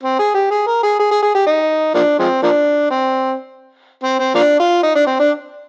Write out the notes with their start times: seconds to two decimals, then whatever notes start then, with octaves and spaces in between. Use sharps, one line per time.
0.03 C4
0.19 G#4
0.35 G4
0.51 G#4
0.67 A#4
0.83 G#4
1.00 G#4
1.11 G#4
1.23 G#4
1.35 G4
1.47 D#4
1.95 F3 A#3 D4
2.19 F3 G#3 C4
2.43 F3 A#3 D4
2.91 C4
4.04 C4
4.20 C4
4.35 F3 A#3 D4
4.60 F4
4.83 D#4
4.95 D4
5.07 C4
5.20 D4